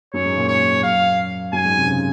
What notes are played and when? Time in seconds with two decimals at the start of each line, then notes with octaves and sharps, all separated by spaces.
0.14 F#2 F#3 C#5
0.25 G#2 G#3
0.37 A#2 A#3
0.48 C#5
0.83 F#2 F#3 F5
1.53 F#2 F#3 G#5
1.64 G#2 G#3
1.76 C3 C4
1.87 C#3 C#4